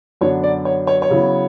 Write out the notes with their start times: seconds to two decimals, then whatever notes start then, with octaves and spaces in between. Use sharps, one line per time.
0.21 F#2 D3 F#3 B3 D4 C#5
0.43 D5
0.65 C#5
0.87 C#5
1.02 C#5
1.10 C#3 F#3 B3 E4